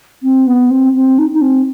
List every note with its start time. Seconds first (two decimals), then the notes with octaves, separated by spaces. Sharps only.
0.23 C4
0.47 B3
0.70 C4
0.95 C4
1.18 D#4
1.34 D#4
1.41 C4